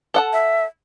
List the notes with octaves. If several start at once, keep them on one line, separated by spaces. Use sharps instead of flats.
A4 F#5 A5
E5